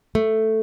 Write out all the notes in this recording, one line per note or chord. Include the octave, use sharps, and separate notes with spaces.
A3